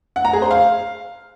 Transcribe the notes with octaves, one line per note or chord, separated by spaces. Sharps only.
F#5
A#5
G#4
C5
F5